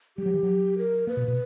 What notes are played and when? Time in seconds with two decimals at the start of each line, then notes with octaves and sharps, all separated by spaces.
0.17 G3 G4
0.26 F#3
0.34 E3
0.43 F#3
0.78 A#4
1.07 A#3 B4
1.17 B2
1.28 B2